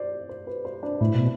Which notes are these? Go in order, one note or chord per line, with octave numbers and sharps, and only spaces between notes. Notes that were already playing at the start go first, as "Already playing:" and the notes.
Already playing: C5 D5
C5
B4
C5
D4
A2 E4
B2